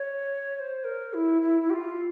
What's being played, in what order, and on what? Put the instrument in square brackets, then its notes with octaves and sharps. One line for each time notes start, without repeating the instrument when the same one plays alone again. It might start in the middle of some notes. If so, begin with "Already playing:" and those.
Already playing: [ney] C#5
C#5
C5
A#4
E4
E4
E4
G4
F4